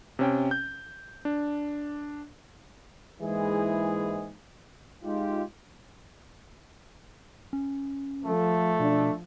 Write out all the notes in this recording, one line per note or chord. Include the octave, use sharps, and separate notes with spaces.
C3 C#4 G5
G6
D4
G#2 E3 G#3 A#3 E4 G#4
G#3 D#4 F4 G4
C#4
F3 A3 A4
B2 D4